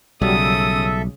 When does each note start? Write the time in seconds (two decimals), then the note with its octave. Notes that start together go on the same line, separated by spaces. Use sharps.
0.22 B1 C#3 F#3 G3 A4 E5 D#6